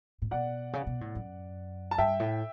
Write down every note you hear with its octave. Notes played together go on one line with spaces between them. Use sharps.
A2
B2 D5 F#5
C#3
B2
A2
F#2
A5
G2 E5 G5
A2